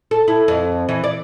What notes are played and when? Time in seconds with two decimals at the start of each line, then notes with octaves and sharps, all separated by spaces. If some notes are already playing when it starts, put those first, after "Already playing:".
0.11 A4
0.28 E4
0.48 F2
0.89 E3
1.04 D5